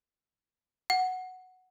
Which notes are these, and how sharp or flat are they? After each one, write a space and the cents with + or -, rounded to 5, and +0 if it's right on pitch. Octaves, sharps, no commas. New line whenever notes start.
F#5 +0